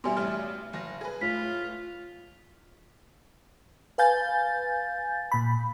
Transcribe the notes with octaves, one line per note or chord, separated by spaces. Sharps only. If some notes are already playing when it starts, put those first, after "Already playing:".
B2 G3 E5 G#5 C6
A1 G3 F6
F#1 A#6
G#4 B4
A2 F4 B6
B4 F5 G#5 G6 A6
A#2 B5